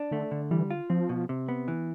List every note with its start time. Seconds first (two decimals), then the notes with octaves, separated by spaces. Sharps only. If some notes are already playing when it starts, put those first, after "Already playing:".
Already playing: D4
0.11 D3 A3
0.31 D3
0.51 E3 G3
0.71 F4
0.90 F3 C4
1.09 B2
1.29 C3
1.49 B3
1.68 E3